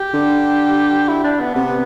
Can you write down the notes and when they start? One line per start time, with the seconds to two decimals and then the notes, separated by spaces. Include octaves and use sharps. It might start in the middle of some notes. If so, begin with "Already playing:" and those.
Already playing: G4
0.14 D3
1.08 E4
1.24 D4
1.40 B3
1.55 C3 B3